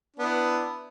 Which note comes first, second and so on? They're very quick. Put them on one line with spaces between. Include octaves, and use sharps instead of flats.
D4 B3 E4